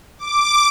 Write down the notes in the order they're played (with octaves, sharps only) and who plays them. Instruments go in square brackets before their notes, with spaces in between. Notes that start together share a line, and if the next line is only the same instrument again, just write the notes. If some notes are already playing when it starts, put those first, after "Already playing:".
[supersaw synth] D6